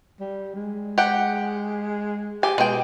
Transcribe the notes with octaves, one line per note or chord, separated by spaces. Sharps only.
G3
G#3
G4 F#5
G4 G#5
B2 G#3 G5